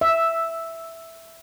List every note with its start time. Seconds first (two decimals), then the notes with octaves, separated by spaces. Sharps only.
0.01 E5